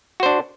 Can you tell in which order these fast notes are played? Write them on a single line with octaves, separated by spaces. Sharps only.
F#4 C5 D4